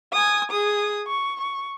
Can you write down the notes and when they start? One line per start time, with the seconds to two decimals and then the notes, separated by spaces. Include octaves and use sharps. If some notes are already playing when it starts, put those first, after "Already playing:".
0.13 G#5 D#6
0.51 G#4 D#6
1.07 C#6
1.41 C#6